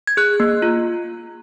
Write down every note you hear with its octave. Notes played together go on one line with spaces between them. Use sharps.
G#6
G#4 F#6
A#3
F4